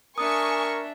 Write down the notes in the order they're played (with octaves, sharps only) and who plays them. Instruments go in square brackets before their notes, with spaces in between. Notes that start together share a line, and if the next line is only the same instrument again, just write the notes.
[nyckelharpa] D4 E5 [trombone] A#4 [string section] G#5 C#6 [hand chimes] D#6